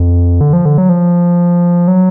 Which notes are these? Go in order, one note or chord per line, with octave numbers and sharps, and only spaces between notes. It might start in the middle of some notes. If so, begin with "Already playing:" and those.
Already playing: F2
D3
F3
D3
F#3
F3
F#3